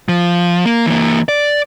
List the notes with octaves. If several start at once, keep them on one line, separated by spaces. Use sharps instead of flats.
F3
A#3
E3 A#3
D5